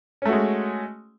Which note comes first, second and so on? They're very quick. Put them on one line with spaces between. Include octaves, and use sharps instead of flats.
C#4 A3 F#4 G#3